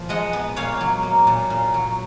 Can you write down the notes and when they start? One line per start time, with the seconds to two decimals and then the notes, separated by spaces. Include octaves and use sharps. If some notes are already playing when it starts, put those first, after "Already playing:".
Already playing: A#2 F3
0.09 G#3 D#5 F#5
0.33 B3
0.56 A#2 C#5 F5
0.81 F#3
1.03 A#3
1.27 A#2
1.50 A#2
1.74 F#3